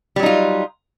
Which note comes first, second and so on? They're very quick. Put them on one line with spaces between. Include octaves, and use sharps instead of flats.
G3 F#3 D#4 F4